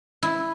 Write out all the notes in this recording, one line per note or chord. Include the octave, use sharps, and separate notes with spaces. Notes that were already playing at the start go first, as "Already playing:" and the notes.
E4